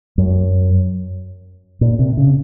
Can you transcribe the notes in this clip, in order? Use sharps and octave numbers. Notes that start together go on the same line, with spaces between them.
F#2
A#2
C3
C#3